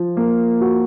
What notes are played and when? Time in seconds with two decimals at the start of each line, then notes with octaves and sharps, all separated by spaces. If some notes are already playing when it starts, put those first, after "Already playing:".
Already playing: F3
0.17 A#3
0.61 F#4